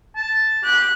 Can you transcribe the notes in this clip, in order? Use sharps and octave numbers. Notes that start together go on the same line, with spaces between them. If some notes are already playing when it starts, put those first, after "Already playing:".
A5
G4 F#6